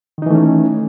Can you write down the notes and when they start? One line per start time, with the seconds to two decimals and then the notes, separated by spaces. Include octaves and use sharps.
0.18 D#3
0.22 D#4
0.26 E3
0.31 A3
0.35 C#4